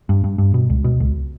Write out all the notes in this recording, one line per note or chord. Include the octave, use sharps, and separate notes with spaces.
G2
G2
G2
B2
C#2
B2
C#2